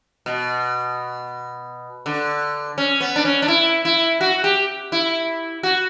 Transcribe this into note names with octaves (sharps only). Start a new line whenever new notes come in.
B2
D3
C#4
B3
D4
C#4
D4
E4
E4
F#4
G4
E4
F#4